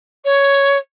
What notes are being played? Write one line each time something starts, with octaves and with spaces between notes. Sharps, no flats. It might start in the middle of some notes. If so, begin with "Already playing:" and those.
C#5